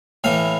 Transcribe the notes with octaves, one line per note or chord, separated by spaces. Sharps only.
A2 E3 F5